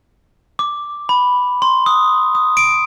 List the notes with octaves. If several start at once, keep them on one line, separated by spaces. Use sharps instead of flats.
D6
B5
C6
D#6
D#6
D7